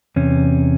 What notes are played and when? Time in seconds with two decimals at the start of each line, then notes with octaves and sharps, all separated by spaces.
0.16 E2 C3 C#4